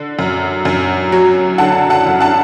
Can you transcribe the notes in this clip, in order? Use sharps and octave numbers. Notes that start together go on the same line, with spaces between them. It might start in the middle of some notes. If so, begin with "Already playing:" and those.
Already playing: D3
F#2
F#2
F#3
D3 F#5 A5
F#5 A5
F#2
F#5 A5